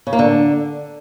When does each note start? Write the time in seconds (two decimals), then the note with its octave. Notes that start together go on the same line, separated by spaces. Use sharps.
0.07 C#3
0.13 A#3
0.19 D3